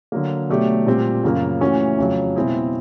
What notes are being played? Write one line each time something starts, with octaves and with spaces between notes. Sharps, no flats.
D3 F#3 A#3
B2 F#3 A3 D4 G4
A#2 G3 C4
F#2 C#3 F3 A#3
E3 A3 C#4 F#4
F2 C#3 F#3
B2 G#3 C4 E4 G#4